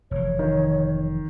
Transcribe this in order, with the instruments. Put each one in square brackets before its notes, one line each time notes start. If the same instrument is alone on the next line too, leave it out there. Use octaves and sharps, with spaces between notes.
[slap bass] F1 E3 [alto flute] C#5
[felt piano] D#3